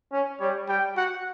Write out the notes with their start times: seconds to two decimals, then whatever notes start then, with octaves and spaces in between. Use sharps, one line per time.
0.12 C#4
0.40 G3 C#5
0.68 G3 G5
0.96 F#4 F#5